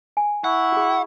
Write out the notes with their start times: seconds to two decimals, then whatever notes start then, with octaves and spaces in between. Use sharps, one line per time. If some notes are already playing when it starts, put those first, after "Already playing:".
0.17 G#5
0.44 E4 F#5 C#6
0.72 F#4 G#4